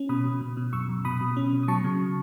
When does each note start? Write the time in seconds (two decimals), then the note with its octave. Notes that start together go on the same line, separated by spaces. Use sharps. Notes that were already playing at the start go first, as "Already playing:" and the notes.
Already playing: C#4
0.09 B2 B5 D#6
0.25 B2
0.41 B2
0.57 B2
0.73 F#2 C#6 E6
0.89 F#2
1.05 B2 B5 D#6
1.21 B2
1.37 C#4
1.53 B2
1.63 D#6
1.68 F#3 A5 C#6
1.84 C#3